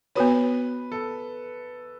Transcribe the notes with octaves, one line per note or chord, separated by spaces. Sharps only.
B3 F#4 B4 C#5
A4